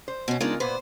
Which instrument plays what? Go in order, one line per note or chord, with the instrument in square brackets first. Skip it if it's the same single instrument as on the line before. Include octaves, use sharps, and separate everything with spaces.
[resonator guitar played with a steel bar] C5
[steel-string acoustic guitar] B2 C#4
[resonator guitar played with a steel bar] C#3 F4 A#4 [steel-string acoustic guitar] G#3 D4 D#4
[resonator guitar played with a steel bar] A#2 B3 B4 [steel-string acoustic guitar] C5